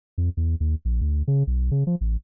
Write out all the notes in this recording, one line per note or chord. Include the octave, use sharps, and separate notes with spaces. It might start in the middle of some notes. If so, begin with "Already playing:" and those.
F2
E2
D#2
A#1
D2
C#3
B1
C#3
F3
A1